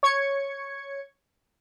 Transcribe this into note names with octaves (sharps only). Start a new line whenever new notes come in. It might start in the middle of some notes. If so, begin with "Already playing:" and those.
C#5 G#6 C#7